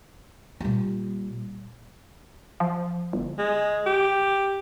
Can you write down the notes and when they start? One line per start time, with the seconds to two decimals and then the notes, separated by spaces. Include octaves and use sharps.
0.60 A#2 G3
2.60 F3
3.13 G1
3.38 G#3
3.86 G4